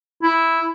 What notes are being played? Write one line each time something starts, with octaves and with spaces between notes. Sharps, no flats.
E4